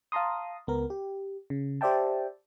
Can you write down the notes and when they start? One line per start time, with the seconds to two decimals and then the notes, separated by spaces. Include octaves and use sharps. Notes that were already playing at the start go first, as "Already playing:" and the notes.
0.12 F5 A5 A#5 C6 D#6
0.67 C#2 B3 A#4
0.90 G4
1.50 C#3
1.81 G4 C5 D5 E5 G5 A5